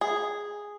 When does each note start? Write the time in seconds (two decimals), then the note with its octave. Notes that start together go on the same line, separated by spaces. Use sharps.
0.01 G#4